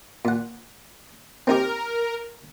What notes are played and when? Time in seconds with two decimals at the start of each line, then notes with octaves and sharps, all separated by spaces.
0.25 A#2 F#5
1.47 C4 D#4 G4 A#4